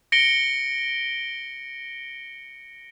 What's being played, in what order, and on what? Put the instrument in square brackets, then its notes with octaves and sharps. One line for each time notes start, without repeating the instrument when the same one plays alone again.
[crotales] A#6 C#7 D7 G7